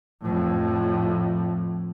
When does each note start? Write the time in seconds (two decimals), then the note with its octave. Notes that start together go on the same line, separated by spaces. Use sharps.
0.22 F2 A2